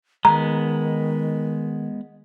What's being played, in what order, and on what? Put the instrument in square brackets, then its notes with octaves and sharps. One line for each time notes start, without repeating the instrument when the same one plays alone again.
[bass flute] D#3 [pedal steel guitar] G#3 B3 [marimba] A#5